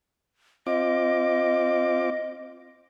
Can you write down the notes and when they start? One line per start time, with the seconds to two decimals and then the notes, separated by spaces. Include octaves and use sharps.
0.67 C4 F4 D#5 D6